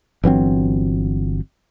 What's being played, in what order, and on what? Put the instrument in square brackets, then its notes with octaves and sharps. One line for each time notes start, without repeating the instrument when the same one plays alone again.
[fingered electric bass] G1 E3 F#3 C4